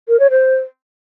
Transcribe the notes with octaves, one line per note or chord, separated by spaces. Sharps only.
A#4
C#5
C5